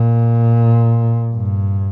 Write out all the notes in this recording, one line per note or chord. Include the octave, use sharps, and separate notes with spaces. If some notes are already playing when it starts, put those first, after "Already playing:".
Already playing: A#2
G2